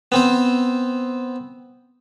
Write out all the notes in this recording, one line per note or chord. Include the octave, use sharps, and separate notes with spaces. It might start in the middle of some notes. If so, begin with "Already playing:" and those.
B3 C4 C5